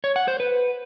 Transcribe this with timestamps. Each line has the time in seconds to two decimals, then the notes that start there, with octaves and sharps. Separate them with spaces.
0.04 C#5
0.16 F#5
0.28 C5
0.40 B4